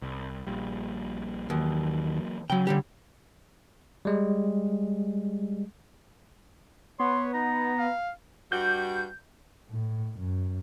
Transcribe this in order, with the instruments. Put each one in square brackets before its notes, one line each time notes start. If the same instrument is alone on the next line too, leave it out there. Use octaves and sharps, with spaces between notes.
[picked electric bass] C2
A#1 A#2 G3
[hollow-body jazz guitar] D#2 [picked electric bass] E3 F#3 A#3
[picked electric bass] C#3 [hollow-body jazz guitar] F#3 G5
[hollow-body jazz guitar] D3 G3 G4
[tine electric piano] G3 G#3
[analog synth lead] B3 [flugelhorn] C#5 [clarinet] C6
[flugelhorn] D#4 [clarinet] A#5
[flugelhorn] F5
[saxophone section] G2 G3 F#4 [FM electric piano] G6
[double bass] A2
F#2